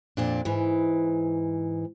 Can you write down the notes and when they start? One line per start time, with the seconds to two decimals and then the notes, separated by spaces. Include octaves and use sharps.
0.17 F2 A#2 D4
0.45 G#2 E3